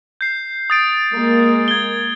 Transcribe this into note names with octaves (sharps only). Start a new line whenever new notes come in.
G6 C7
D#6 A6 D7
G#3 A#3
G#6 G7